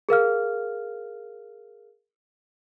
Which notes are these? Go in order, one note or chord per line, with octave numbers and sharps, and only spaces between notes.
G#4 A#4 F5 F6